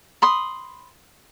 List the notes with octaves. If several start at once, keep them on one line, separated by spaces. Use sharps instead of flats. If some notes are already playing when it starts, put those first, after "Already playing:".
B5 C6 D#6